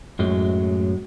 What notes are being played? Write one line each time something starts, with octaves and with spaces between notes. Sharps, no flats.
F#2 A2 F#3 G#3